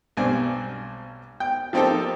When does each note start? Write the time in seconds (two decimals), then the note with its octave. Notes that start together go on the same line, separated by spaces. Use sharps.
0.17 B1 G2 C4 G#5
1.40 G5
1.73 F3 A#3 C4 D#4 G4 A4